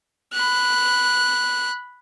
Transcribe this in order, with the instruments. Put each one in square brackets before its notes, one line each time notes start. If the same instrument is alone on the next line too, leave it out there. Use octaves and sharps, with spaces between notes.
[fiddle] B5 F#6